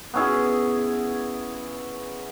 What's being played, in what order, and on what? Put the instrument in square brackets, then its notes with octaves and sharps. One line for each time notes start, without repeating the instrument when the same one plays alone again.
[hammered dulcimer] B3 C#4 E4 G#4